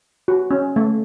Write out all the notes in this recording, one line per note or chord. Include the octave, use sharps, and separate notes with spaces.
F#4
C#4
A3